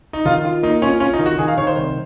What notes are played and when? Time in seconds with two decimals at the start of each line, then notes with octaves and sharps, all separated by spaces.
0.13 D#4
0.25 D#3 F4
0.45 F4
0.63 A#3 D#4
0.82 C#4 F4
1.00 C#4 F4
1.13 D#4
1.19 D#3
1.26 F#4
1.39 D#3 G#4
1.48 F5
1.57 D#3 C#5
1.67 C5
1.76 C2